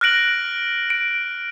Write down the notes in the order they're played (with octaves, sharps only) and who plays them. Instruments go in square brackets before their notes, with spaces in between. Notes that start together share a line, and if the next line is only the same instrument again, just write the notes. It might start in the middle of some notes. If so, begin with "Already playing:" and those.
[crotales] F6 F#6 A#6 D7 F#7
D7